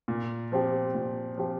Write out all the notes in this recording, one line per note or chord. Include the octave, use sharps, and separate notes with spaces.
A#2
F3 C4 G4
A#2
F3 C4 G4